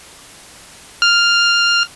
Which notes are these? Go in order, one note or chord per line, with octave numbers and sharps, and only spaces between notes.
F6